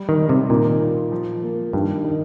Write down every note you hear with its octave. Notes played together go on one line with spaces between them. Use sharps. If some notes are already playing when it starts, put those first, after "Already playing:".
Already playing: G3
D#3
G3
C3
A#2 D#3
F4
F3
A#3
G2 D#3
D#3